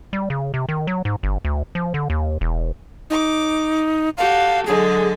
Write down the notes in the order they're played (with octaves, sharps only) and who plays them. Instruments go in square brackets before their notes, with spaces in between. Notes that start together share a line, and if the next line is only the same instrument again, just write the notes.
[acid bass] G3
C#3
C3
D#3
F#3
G#2
G1
D2
F3
D3
D#2
E1
[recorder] D#4 [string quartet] D6
[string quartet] F#4 G4 A4 [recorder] F5
[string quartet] D3 F#3 G#3 [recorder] G#4